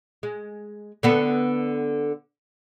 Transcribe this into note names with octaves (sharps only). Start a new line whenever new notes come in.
G#3
D3 B3 A4